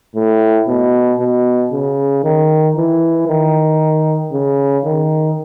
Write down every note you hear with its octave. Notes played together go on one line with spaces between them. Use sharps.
A2
B2
B2
C#3
D#3
E3
D#3
C#3
D#3